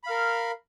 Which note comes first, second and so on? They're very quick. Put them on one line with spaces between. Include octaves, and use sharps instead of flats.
B5 F5 A#4